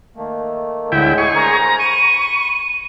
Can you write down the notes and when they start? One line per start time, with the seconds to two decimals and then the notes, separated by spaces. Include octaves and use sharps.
0.16 D#3 A3 A#3
0.92 D2 A2 D3 G#3 E4 G5
1.18 G#4 C#6
1.35 A#4 C5 G#5 A#5
1.79 B5 C#6 D#7